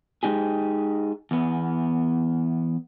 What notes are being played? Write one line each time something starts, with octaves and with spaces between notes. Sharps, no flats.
G#3 D#4 G4 G#4
E2 B3